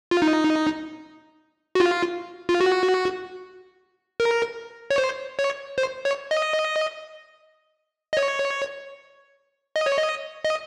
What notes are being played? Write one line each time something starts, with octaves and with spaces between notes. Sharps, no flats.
F4
D#4
F#4
F4
F4
F#4
A#4
C#5
C5
C#5
C5
C#5
D#5
D#5
C#5
D#5
C#5
D#5
D#5